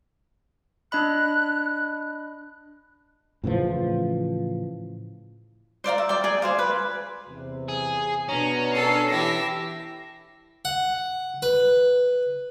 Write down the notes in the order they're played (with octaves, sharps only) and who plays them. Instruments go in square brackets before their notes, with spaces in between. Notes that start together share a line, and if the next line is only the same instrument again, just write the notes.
[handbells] D4 D#5 B5 [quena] F#6
[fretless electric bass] A2 C#3 E3 F3
[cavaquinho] C5 D5 F5 A#5
E5
D5 G5
G#4 D5
G#4 C5 F5
B4
[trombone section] E2 C3
[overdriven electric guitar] G#4
[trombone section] B2 D4 [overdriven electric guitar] C#4 [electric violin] A#5
[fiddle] A4 [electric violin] C7
[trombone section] E3 E4 [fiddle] G4 E5 [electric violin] A#6
[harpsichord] F#5
B4